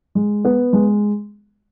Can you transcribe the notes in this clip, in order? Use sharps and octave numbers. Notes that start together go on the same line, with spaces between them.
G#3
B3
G#3